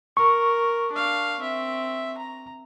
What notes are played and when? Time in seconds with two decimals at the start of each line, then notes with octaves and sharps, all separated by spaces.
0.17 A#4 C#6
0.92 D4 F5
1.40 C4 E5
2.18 A#5